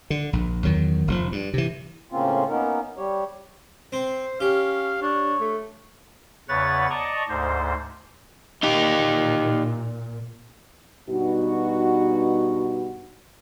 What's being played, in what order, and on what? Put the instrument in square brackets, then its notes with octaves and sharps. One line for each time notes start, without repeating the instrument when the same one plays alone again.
[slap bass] D3
A#1
E2 D#3 F#3
F1 B2 F3
G2
C3 E3
[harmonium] A2 C#3 A#3 C4 C#4 F4
A#3 B3 C#4 D#4 A#4
G3 G4 C#5
[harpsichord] C4 [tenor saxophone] C5
[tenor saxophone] C#4 [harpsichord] G4 [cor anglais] F5
[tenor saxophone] D4 [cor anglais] C#5
[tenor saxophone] A3
[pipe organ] E2 C#3 B4 C#5 F#5 A6
D5 D#5 A5 A#5 C#6
D2 G#2 C5
[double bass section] A#2 [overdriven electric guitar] D#4 G4
[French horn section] G2 B2 D#4 F#4